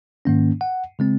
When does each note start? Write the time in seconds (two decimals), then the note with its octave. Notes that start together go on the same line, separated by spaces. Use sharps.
0.25 G#2 D#3 A#3 C#4
0.61 F#5
0.99 C#3 G#3 C4